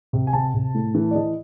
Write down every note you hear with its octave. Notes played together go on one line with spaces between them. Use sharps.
C3
G#5
C3 A5
C3
A2
E3
D5
E3 D#5